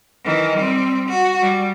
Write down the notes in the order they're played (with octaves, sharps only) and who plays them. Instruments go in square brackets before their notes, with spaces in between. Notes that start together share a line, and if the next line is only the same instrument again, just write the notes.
[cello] D#3 E3
G3 C4
F#4
G3